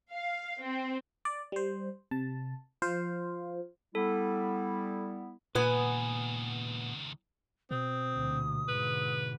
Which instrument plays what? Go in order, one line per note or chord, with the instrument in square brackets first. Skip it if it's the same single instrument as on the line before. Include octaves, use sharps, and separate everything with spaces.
[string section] F5
C4
[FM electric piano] D5
G3 C5
C3 A5
F3 F4 C5 F5
[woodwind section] G3 B3 E4 [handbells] A4
[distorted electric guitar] C#2 D#3 [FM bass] A#2 [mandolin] B3 G#5 [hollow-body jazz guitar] B4
[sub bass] B2 [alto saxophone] C4 [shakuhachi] D#6
[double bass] D2 A#2
[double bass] G#2 D3 [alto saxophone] B4